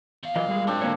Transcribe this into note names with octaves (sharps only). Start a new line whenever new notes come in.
E2 F5
A#2 E3 F#3 D#5
G3 G#3
G#2 F#3 C4 D4
D3 A#3 C#5